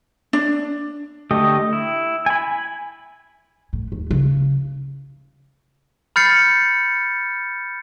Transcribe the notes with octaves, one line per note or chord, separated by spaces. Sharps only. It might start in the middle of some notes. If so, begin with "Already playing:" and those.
D4
D3 A3 G4 D#5
E4
G#5 B5
A2
D#2
C#3
B5 F6 G6 A6 C7 C#7